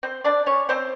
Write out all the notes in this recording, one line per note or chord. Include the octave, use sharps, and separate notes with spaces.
C4 C5
D4 D5
C#4 C#5
C4 C5